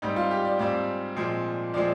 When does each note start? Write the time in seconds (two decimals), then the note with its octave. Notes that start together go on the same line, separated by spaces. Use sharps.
0.02 G#2 G3 C4 D#4
0.16 F4
0.31 G4
0.45 D5
0.59 G#2 G3 C4 D5
1.16 A#2 F3 G#3 C4
1.73 A#2 F3 G#3 C4 D5